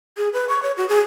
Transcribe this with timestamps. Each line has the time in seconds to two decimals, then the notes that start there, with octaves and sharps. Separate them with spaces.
0.17 G#4
0.33 B4
0.49 C#6
0.63 C#5
0.77 F#4
0.89 G#4